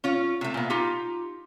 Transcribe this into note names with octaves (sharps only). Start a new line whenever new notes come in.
C#4 F4 C#5
C3 A3
A#2 B3
D#4 F4 G4